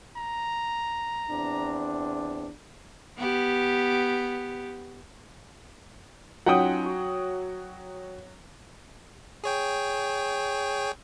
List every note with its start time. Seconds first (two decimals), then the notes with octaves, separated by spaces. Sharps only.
0.17 A#5
1.29 E2 C4 D4
3.18 B3 G4
6.46 F#3 C#4 D#4 F4 F#5 G5 D#6
6.86 F#4
9.44 G#4 C#5 G5